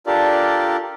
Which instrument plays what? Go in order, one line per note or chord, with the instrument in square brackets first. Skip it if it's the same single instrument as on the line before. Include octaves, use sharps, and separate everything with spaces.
[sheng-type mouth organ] D4 F4 G4 A4 A#4 D5